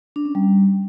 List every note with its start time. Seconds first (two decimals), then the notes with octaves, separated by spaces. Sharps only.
0.16 D4
0.25 C#4
0.35 G3